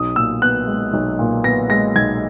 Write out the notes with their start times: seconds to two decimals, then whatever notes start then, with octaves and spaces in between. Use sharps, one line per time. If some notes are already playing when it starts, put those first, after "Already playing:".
Already playing: B1 D#6
0.16 A#2 E6
0.42 B3 F#6
0.68 G#3
0.93 B1
1.19 A#2
1.44 B3 A#6
1.70 G#3 A#6
1.96 B1 G#6